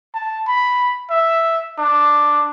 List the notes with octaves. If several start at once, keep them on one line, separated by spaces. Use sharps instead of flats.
A5
B5
E5
D4